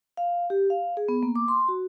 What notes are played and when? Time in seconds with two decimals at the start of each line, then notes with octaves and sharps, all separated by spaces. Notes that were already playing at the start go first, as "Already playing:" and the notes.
0.17 F5
0.50 G4
0.70 F5
0.97 G#4
1.09 B3
1.23 A#3
1.36 D6
1.48 C6
1.68 F#4